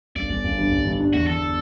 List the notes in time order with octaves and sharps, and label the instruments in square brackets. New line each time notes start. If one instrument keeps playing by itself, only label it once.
[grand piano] G1 [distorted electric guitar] D5
[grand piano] G1
G1
G2
G1
G2
D4
[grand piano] E2 [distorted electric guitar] F#4
[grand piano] D3 [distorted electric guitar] A4